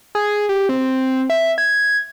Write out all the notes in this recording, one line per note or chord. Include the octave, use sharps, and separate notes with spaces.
G#4
G4
C4
E5
G#6